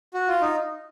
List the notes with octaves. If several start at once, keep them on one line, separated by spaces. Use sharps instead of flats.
F#4
F4
D#4